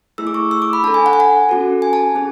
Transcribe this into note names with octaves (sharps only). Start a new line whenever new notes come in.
A3 E4 G#4 E6
D6
C#6
E6
D6
B5
D4 A4 A5
G#5
F#5
G#5
F#5
C#4 F#4 A4
G#5
A5
C#4 G#4